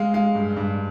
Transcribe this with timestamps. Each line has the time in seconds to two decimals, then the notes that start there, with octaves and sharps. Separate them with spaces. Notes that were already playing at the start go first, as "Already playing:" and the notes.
Already playing: G#3 F5
0.14 G#3 F5
0.35 G2
0.56 G2